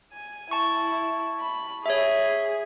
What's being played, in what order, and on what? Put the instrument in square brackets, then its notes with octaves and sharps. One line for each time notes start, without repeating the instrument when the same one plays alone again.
[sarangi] G#5
[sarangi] E4 [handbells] A5 C#6
[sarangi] B5
[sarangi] G#4 [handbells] C#5 E5